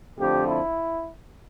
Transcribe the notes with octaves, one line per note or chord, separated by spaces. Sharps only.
F2 D3 F3 A3 G4
E4